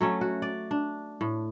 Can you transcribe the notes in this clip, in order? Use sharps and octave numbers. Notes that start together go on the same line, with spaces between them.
F#3 A3 C#4
F#4
D5
D4
A2